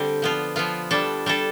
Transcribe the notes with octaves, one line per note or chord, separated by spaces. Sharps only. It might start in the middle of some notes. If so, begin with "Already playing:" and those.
Already playing: D3 G3 C4
F3 B3 F4
F3 B3 F4
G3 D4 A4
G3 D4 A4